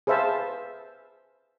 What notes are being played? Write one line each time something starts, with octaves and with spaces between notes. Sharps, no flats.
G#4 B4 C5 E5 F5 A5